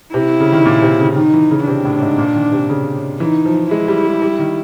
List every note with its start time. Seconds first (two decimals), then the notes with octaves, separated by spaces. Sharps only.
0.14 C3 E4
0.40 C#3
0.52 D#3
0.66 A#2
0.82 C3
1.00 C#3
1.16 D#3 D#4
1.34 E3
1.51 C#3
1.67 C3 D4
1.85 A2
2.01 G#2
2.18 A#2
2.35 D#3
2.52 C3
2.69 C#3
3.20 E3 D#4
3.46 F3
3.71 G#3 E4
3.88 G3
4.05 G#3
4.22 G3
4.39 D#3